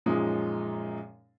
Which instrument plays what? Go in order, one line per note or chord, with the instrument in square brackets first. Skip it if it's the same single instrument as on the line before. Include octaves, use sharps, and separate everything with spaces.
[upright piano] F#2 A#2 F3 G#3 C#4 D#4